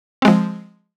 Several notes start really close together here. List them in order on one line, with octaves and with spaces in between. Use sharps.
C4 G#3 F3